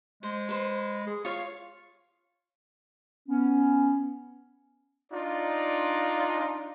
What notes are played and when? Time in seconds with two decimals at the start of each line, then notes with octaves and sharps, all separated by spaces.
0.23 G#3 C5
0.49 B4 C5
1.07 G#4
1.25 F4 C#5 F5 C#6
3.28 B3 C#4
5.12 D4 D#4 F4 D5